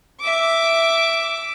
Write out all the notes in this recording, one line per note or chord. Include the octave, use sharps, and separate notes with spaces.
E5 D6